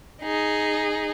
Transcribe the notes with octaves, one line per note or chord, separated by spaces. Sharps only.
D#4 G#4